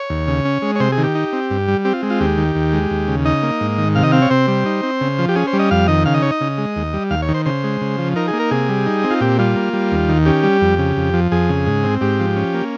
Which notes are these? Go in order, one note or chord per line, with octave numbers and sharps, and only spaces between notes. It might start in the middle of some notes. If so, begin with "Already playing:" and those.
Already playing: C#5
D#2
C#3
C#4
G#3
C#5
C3 C5
G#4
D#3
G4
D#4
C4
G2
G3
C4 G4
F4
G#3
F4
D#2 G4
D#3
D#2
G#3
D#2
C#3
D#4 D#5
A#3
G#2
D#3
C3 F5
D#5
C4 F5
C#5
C3 C5
G3
D#4
C4
C#3
F3
G4
C#4 G#4
C5
G3
D#5
F2 F5
D#3 D#5
C#3 F5
D#5
D#4 C#5
D#5
C#3
G#3
D#2
G3
D#2 F5
C#5
D#3
C5
C#3 C5
G#3
C#3
F3
D#4 A#4
G#4
A#3
A#4
C3 G#4
G3
D#4
C4
F4
A#2 G4
G3 F4
A#3
G3
D#2
D#3
C#4 G4
G3
F2
C#3
F2
F3
F2 G#4
C#3
G#2
C4
G#2 G4
F3
C#4
A#3